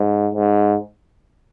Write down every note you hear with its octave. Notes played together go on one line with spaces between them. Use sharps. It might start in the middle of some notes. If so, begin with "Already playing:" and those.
Already playing: G#2
G#2